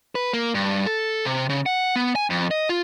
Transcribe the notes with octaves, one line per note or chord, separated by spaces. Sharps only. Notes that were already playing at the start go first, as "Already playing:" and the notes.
B4
A#3
G2
A4
C3
C#3
F#5
B3
G#5
F2
D#5
F4